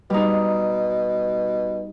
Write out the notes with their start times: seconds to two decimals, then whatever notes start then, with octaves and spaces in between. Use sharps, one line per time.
0.10 B2 G3 D#4